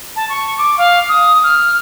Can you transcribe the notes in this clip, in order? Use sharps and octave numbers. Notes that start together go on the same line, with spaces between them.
A5
C#6
D6
F5
D#6
F6